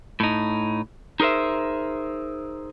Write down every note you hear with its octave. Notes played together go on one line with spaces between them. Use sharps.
A2 D#4
D#4 G#4 A#4 C5 E5